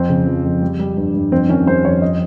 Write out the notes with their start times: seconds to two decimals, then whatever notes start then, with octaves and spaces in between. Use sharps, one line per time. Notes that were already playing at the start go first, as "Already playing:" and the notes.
Already playing: F2 C4
0.09 C#3
0.26 F3
0.44 F2
0.62 G3
0.79 G3
0.97 G2
1.14 G2
1.32 F2 C4
1.49 D#3 C#4
1.67 G3 C5
1.84 F2 C#5
2.02 D#5